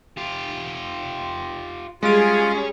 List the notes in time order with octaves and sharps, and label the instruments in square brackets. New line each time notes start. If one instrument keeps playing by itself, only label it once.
[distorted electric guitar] F4 G4
[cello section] G3 G#4 [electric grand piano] G#3 D7 [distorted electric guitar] C#4 [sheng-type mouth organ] F4